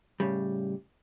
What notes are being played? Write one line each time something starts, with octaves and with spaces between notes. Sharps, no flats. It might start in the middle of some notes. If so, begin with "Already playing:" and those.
A2 C#3 G3